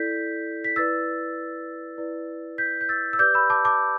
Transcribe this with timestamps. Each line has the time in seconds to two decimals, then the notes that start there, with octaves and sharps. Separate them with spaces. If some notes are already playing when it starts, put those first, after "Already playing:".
Already playing: E4 A4 D5 G6 B6
0.64 B6
0.76 E4 B4 D5 E6 A6
1.98 E4 B4 D5
2.58 G6 B6
2.81 G6
2.89 E6 A6
3.13 E6
3.19 G4 B4 D5 D6 G6
3.34 B5 E6
3.50 A5 D6
3.65 A5 D6